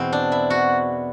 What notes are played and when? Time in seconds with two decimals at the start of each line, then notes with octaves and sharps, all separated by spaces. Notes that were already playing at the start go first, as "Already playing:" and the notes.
Already playing: E2 B2 C4
0.13 D4
0.32 E4
0.50 F#4